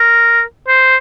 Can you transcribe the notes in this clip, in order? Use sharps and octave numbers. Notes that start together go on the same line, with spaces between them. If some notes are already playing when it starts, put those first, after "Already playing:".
Already playing: A#4
C5